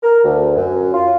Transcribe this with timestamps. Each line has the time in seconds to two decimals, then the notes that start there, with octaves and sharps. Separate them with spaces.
0.03 A#4
0.24 D2
0.55 F#2
0.94 F4